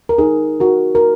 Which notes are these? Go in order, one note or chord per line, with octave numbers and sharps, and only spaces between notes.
A#4
D#4 G#4
F#4 A#4
A#4